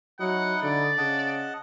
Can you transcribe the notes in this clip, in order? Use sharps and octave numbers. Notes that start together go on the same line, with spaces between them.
F#3 D#4 E4 D#5 F#5
D3 D5
C#3 D#5 F#5 A5